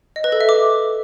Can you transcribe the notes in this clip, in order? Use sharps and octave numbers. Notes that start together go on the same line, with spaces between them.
D#5
B4
A4
E5
D6